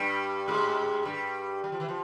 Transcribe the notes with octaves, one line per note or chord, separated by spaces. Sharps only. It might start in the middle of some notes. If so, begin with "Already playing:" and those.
Already playing: G2 G3
G#2 G#3
G2 G3
G3
F3
E3
F3